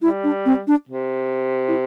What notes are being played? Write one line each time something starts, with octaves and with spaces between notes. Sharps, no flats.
G3 E4
D4
C4
D4
C3
E4